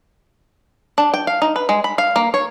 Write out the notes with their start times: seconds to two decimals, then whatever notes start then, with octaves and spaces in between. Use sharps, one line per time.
0.98 D4
1.14 G5
1.27 F5
1.42 D#4
1.56 B4
1.69 G#3
1.84 B5
1.98 F5
2.16 A#3
2.34 C#5